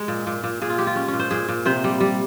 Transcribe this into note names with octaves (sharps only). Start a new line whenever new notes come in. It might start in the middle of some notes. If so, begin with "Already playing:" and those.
Already playing: G#3
A#2
A#2
A#2
A#2 G#4
F4
G#3 G4
F4
G#3 C#4
C#4
A#2
C5
A#2 G#4
A#2
C3 C5
G3
G3